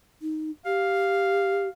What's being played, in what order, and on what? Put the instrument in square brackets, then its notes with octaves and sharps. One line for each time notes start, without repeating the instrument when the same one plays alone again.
[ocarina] D#4
[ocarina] G4 [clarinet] F5